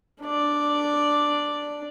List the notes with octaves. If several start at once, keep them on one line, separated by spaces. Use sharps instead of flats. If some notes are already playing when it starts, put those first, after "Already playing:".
D4 D5